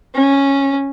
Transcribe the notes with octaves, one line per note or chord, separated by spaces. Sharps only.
C#4